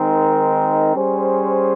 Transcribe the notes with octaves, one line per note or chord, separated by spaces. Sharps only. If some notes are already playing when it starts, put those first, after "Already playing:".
Already playing: D#3 G#3 C4 D#4 A#4
G3 C#4 G#4 C5